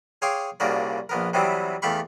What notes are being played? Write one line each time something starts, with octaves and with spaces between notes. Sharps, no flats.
G#4 C#5 F5 G5 C6 D6
C2 A#2 C#3 F#4 A#4 D5
A#1 B3 A#4
C3 E3 F#3 G3 B3 C4
E2 A3 G4 F5 B5 C#6